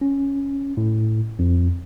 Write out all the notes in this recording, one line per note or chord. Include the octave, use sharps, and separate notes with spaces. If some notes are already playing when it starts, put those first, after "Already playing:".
C#4
A2
F2